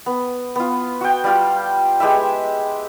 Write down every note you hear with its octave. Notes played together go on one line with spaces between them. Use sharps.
B3
B3 F4
F#4 G5
G3 F4
G#3 G4 B4 E5